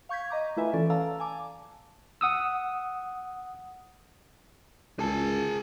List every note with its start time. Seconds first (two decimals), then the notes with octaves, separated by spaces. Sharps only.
0.09 F5 C#6 G6 G#6 B6
0.30 D#5 A#5 D6
0.57 A3 E4 F4 B4 E5 G#5
0.73 E3 C#4 A4 D5
0.90 A4 D5 F5 A5 A#5 E6
1.20 G#5 A5 D6
2.21 F#5 D#6 E6
4.99 C#2 G#4 A5